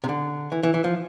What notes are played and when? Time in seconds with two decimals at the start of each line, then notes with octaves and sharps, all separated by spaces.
0.04 C3
0.09 D3
0.52 E3
0.63 E3
0.74 E3
0.84 F3